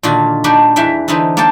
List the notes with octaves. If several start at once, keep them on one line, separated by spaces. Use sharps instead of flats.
A#2 D3 D#3 F4 F#4
G3 D4 D#4 F#4 G4
E2 E3 E5 F5 G5
D3 E3 B3 C4 D#4
A#3 A4 C5 G5 A5